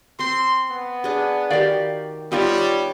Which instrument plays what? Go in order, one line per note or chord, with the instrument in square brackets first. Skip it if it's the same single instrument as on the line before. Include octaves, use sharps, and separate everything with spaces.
[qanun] C4 C5 [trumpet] C6
[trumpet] B3
[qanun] D4 G#4
[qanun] D#3 G4 [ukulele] F#4 D5 F5
[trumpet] G3 [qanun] B3 G4 C#5 [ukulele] D#4 F4